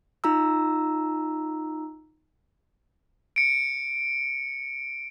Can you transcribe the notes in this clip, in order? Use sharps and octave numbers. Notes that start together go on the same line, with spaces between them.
D#4 F4 A#5 E6
C#7 D7